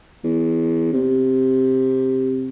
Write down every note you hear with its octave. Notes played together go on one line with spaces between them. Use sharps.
E2
C3